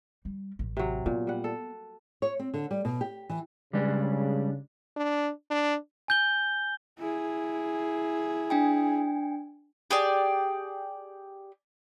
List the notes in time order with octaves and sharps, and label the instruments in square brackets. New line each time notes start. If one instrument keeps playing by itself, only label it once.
[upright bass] G3
A1
[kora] C3 F#3
[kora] A#2 [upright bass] B3
[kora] G3 F#5
A4
[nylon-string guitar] C#5
C4
D3
G3
B2
G4
E3
[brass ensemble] C#3 [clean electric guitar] G3 G#3 D4
[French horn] D4
D4
[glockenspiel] G#5 G6 G7
[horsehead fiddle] E4 G#4
[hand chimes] D4 G5 G#5
[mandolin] G4 G#4 D5